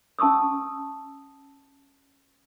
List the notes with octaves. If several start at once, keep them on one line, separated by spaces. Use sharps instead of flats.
C#4 A5 C#6 D#6 E6